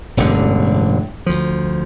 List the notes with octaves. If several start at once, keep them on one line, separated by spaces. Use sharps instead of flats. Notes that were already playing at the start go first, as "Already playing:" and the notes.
E1 A1 G2 D3
D2 F3